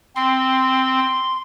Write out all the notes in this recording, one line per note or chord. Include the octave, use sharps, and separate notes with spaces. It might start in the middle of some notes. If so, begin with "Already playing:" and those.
C4 C6